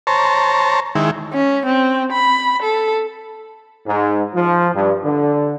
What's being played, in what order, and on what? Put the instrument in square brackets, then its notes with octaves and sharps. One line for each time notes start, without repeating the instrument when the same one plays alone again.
[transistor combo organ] C5 C#5 A5 A#5
D#3 G#3 E4
[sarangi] C#4
C4
B5
A4
[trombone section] G#2
F3
G2
D3